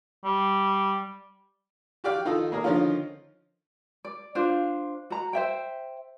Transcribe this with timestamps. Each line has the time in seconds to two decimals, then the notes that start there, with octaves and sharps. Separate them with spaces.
0.24 G3
2.04 F#4 G4 D5 F5 G5
2.25 D#3 D#4 F4 A4
2.52 A#3 G#4 A#4
2.64 D3 D#3 F3 C#4 D#4 F4
4.05 D5
4.35 D4 F4 C5 F5
5.10 F#4 A#5
5.33 C5 E5 G5